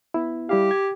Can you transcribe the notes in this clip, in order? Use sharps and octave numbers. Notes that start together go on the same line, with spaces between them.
B3 E4
G3 E4 G4 F5
G#6